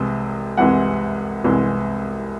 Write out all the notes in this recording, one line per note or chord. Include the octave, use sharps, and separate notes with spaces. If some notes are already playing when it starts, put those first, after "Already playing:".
Already playing: C2 C3 E3 G#3
C2 C3 E3 G#3 F#5
C2 C3 E3 G#3